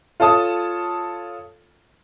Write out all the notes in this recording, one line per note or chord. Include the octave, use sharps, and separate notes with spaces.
F4 A4 C#5 A5 D#6